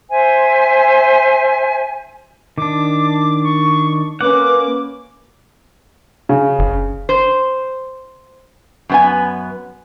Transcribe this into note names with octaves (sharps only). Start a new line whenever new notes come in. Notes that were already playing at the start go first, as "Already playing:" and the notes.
C5 E5 G#5
D#3 D4 D6
C#6
A#3 C#4 B4 F#5 D6
C#3
F#1
C5
F#2 B3 G#5